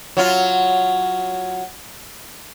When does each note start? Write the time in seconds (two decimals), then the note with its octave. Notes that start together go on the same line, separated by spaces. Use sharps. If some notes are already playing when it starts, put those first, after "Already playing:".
0.17 F#3 F4